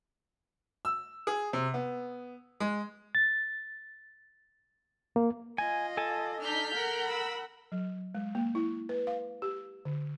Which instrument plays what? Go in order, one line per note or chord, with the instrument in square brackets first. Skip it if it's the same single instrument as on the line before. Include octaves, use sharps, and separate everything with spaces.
[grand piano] E6
G#4
C3
B3
G#3
[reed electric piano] A6
A#3
[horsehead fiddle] F4 D#5 [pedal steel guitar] G#5
[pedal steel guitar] A4 G#5 A5
[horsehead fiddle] D4 D#4 [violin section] F6 G6 B6
[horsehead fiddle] A#4 F#5
[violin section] B5 E6
[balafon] F#3
G#3
A#3
E4
B4
F5
G4
D3